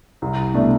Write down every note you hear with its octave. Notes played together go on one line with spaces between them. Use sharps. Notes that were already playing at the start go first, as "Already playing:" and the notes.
C2
B2 A3 D4